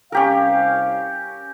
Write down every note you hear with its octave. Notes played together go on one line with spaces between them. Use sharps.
C2 C#4 G4 A#4 F5